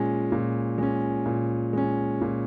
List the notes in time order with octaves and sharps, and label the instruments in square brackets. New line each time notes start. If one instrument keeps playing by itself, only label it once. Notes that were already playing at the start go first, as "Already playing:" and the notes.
Already playing: [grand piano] A#2 G#3 C#4
A#2
G#3 C#4
A#2
G#3 C#4
A#2